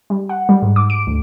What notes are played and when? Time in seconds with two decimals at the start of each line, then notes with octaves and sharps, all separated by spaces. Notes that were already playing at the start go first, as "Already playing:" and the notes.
0.10 G3
0.29 F#5
0.49 G3
0.62 G#2
0.76 D6
0.90 D7
1.07 D2